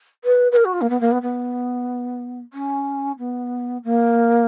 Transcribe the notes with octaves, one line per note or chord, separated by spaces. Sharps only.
B4
B4
A#4
F#4
F4
A#3
B3
A#3
B3
B3
C#4
B3
A#3